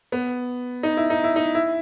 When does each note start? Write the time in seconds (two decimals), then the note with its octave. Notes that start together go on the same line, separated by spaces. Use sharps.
0.12 B3
0.83 D#4
0.97 E4
1.10 D#4
1.24 E4
1.36 D#4
1.55 E4